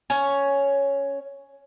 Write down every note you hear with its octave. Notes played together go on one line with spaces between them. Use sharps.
C#4 C#5